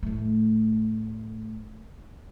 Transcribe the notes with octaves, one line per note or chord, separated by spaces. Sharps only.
A2 A3